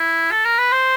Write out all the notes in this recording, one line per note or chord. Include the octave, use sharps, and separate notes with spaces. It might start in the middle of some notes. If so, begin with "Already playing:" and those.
Already playing: E4
A4
A#4
B4
C5